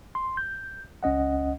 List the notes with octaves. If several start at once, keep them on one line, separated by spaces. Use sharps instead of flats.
C6
G6
C#2 C#4 D#5 F#5